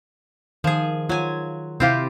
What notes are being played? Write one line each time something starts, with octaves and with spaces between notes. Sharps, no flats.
D#3 F3 G#4
F#3 F4 G#5
C3 C4 E4 F4 G4 F5